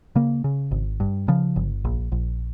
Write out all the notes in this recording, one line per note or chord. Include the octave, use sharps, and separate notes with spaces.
C#3 A#3
C#3
G#1
G2
C#3 F3
G1
A#1
A#1